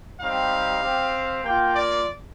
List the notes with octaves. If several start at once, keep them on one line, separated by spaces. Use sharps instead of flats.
G3 C4 D#4 G4 F5
C4 G4
A#3 F4 G5
D5